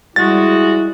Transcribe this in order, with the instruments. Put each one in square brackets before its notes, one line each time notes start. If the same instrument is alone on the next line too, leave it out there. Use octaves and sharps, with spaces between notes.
[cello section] G3 [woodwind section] G#3 F#4 [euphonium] E4 [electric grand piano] A6